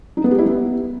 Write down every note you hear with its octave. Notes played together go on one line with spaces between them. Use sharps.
D#4
B3
G4
E4
B3